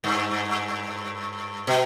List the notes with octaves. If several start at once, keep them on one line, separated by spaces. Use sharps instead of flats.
G2
B2